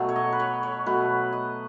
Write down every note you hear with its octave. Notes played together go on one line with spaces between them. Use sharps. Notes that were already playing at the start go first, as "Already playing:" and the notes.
Already playing: B2 F#3 A3
C#5
D#5
B4
C#5
C#5
B2 F#3 A3 B4
D#5